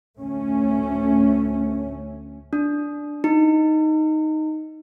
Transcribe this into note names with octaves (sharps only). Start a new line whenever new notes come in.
D2 A3 C#4
D4
D#4